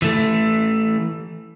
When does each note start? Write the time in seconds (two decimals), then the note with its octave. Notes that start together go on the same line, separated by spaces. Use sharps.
0.02 E3 A3